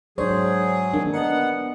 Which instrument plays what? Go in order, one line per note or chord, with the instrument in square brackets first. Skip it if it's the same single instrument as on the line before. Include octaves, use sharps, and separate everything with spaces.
[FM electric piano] G#2 D4 C#5 [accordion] F#3 G#4 [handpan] C5
[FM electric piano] D#3 G#3 A#3 [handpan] D4
[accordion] B3 F#5 [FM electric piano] A#4 D#5